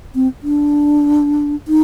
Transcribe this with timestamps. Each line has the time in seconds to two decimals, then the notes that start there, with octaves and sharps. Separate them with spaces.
0.15 C4
0.43 D4
1.68 D#4